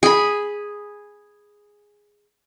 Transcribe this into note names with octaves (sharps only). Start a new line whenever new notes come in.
G#4 B5